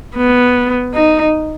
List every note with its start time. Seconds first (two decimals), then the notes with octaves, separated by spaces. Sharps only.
0.16 B3
0.94 D#4